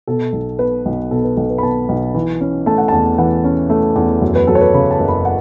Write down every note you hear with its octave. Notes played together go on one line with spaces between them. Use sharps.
B2 A4
B1
B3 B4
B1
B2 A4
B4
B1 A4
B4
B5
B3 A5
B1
E3
C#4
A3 A5
F#5
E2 A5
E3 F#5
C#4
A3
E2
F#2
B4
F#3 A4
C#5
B4
C#3 B5
A5
F#1
B5
F#5